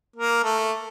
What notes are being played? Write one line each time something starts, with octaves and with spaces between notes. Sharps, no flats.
A#3 A#4
A3 A4